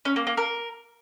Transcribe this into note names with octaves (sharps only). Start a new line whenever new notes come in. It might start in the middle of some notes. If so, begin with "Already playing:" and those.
C#4
A#3
A#3
A#4